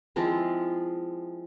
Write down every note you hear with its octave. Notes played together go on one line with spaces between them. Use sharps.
F3 G#3 C4 E4